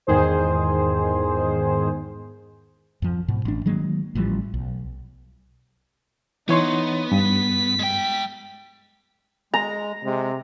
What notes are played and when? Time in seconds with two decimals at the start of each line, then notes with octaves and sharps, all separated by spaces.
0.07 E2 G#2 D#3 G#4 C5
3.02 F2 F3
3.28 G#2 B2
3.45 A1 D4
3.66 D#3 F#3 G#3 A#3
4.15 A1 E3 F3 G3
4.54 B1
6.49 E3 B3 D#4 C#5 C6
7.12 G2 B6
7.79 G#3 G5
9.54 G#3 A#5
10.05 C3 G#3